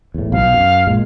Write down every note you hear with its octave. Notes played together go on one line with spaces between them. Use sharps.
E2 A2
B1 B2 F5
F#2
A#2 G#3